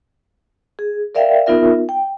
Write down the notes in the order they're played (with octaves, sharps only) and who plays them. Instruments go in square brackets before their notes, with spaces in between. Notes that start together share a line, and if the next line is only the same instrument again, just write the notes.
[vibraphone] G#4
A#4 D5 E5 F5 G5
B3 D#4 F4 A#4 E5
G5